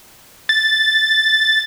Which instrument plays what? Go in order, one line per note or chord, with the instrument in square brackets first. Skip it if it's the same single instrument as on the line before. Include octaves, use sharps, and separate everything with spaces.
[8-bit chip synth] A6